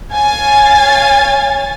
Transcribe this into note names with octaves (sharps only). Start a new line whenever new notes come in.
C#5 F5 G#5 A6